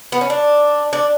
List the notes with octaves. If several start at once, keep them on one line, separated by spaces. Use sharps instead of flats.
B3
C#4
D4
D4